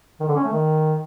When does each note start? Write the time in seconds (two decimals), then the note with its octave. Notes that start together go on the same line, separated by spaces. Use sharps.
0.20 D#3
0.28 D3
0.36 C#4
0.44 A3
0.52 D#3